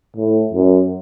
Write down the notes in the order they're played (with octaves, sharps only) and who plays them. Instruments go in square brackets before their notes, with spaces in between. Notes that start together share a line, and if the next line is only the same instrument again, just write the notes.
[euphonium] A2
F#2